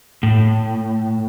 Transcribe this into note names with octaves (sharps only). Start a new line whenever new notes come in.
A2